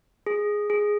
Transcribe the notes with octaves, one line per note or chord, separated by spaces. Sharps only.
G#4
G#4